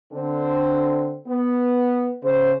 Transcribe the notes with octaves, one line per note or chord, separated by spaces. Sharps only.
D3 C4
B3
C#3 C5